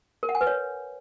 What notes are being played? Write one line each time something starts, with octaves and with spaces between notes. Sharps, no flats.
A#4
F#5
G#5
B4
C#5